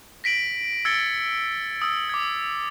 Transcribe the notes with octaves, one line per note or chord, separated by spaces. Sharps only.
A#6 B6 D7 F#7
E6 G#6 A6 C#7 D7 G7
D#6 E6
D6 G#6